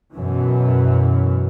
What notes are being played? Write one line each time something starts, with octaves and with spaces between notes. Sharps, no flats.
F#2 B2 E3